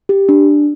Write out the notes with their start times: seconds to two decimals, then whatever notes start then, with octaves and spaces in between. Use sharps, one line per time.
0.09 G4
0.29 D4